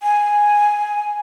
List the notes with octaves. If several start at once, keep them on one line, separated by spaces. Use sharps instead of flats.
G#5